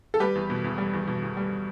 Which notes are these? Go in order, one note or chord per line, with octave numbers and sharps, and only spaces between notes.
A4
G3 G4 B4
E2
B2
E2
G3
E2
B2
E2
G3